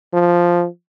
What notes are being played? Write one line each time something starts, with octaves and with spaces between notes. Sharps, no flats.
F3